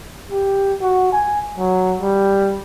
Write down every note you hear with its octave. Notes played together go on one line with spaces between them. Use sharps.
G4
F#4
G#5
F#3
G3